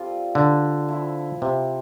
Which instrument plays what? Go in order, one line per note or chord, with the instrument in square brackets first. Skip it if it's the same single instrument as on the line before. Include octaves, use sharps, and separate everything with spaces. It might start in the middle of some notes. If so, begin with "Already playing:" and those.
Already playing: [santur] G3 C4 F4 A4
[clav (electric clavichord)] D3
[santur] F3 C4 E4
[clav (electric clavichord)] C3